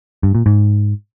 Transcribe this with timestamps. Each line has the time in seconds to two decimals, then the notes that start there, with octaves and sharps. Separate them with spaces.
0.23 G2
0.35 A#2
0.46 G#2